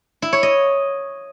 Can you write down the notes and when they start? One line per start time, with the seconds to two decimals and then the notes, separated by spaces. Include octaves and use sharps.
0.22 E4
0.33 C#5
0.43 D#5